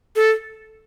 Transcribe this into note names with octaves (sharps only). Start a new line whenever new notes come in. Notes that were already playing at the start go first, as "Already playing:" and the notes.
A4